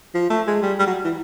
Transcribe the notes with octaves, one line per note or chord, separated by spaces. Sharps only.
F3
A3
G#3
G3
G3
F#3
E3